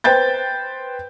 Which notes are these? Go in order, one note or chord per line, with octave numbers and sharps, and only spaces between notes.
B4 C5 G5 G6 A6